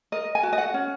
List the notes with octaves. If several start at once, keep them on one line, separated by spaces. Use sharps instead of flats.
A#4 D#5
G#5
F#4
D#5
F#5
C#4